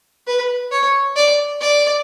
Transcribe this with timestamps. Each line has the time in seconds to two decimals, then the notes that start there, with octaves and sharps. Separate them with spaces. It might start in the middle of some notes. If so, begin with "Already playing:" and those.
0.27 B4
0.72 C#5
1.16 D5
1.61 D5